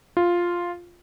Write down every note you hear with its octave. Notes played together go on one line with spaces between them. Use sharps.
F4